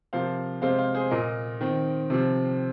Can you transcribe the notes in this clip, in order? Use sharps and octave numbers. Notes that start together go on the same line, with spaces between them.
C3 F3 A#3 C5 F5
C3 G#3 C4 C5 F5
C5 F5
G#4 C5
A#2 A#3 A#4 D#5
D#3 C4
C3 F3 C4